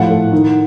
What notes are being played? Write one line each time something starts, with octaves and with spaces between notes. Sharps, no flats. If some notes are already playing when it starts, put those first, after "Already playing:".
Already playing: A2 F3 F#5
A3
D#3